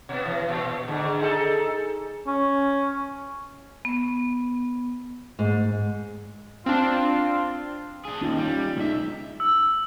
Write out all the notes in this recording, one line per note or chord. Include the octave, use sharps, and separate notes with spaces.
B2 B3
E3
A#2
G#2 D3
D#4 G#4 A4
C#4
B3
G#2
C4 D4 F4
D4 G#4
D#2 C#4 D#4 F4
G3
B1 G#3 D#4 E5
E6